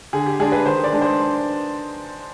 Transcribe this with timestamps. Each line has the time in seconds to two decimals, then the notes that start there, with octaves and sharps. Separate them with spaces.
0.13 D3 G#4
0.26 G4
0.39 G#3 D4 G#4
0.52 B4
0.66 D#3 C5
0.84 D5
0.92 G#3 D4
1.02 C5